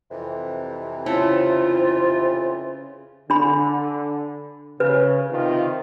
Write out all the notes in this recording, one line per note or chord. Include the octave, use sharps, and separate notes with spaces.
F2 C3 E3
C#3 E4 F4 A4 C5
D3 D4 B5
C#3 B4
C3 D#3 F4